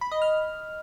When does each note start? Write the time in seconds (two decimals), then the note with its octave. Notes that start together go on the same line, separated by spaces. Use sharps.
0.01 B5
0.12 D#5
0.22 F6